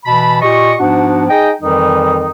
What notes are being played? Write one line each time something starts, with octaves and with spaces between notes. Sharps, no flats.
B2 E3 A5 B5
A#2 G4 D#5 C#6
G#2 F3 B3 D4 F#4
D#4 G#4 D#5 G5
F2 D#3 E3 G3 D#4